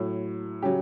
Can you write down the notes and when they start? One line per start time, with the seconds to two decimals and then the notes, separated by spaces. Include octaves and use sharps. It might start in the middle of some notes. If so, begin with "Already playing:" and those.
Already playing: A2 F#3
0.62 C#3 F#3 G4